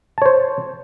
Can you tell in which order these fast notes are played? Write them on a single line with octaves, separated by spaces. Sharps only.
A5 C#5 C5